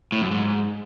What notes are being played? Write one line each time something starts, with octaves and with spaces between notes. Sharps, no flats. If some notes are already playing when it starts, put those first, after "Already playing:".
A2
F#2
G#2